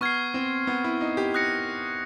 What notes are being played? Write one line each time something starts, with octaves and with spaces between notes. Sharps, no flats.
B3 C#6 F6 G#6 C7
C4
B3
E4
D#4
G4
D#6 F#6 A#6 C#7